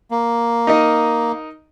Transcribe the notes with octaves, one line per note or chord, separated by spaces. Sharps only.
A#3
D#4 A#4 D#5